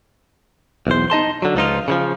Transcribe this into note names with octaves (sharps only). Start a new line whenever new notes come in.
B1 E2 C5
D#4 D#5 A5 C6
D3 F#3
C#2 F3 D#4 F4
C#3 E3 F3